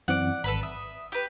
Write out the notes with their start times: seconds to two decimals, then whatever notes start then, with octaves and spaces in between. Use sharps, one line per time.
0.08 F#2 E3 C4 D5 F#5
0.44 G#1 A4 B4 B5
0.63 E5 D#6
1.12 G4 B4